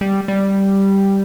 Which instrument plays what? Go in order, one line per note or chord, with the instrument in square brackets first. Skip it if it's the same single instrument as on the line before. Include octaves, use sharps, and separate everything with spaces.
[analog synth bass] G3
G3